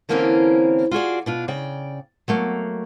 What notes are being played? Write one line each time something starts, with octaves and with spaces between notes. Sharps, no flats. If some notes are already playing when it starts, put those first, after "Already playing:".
D3 E3 A#3 C4 C#4 A#4
F4 F#4 G#4 D5
B2 D4 F4
C#3 D5 G5
F#3 A3 A#3